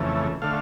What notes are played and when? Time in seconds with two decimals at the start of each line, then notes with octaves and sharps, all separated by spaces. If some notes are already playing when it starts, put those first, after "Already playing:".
Already playing: F2 C#3 E3 A3
0.42 D3 A3 F5